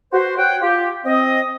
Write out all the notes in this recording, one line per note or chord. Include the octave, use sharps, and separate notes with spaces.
F#4 B4 C5
F#4 C#5 F#5 G5
F4 G4
C4 D#5